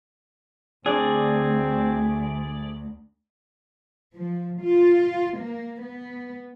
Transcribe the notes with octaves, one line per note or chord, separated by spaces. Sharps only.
D2 C4 D4 G#4 D5
F3
F4
A#3
B3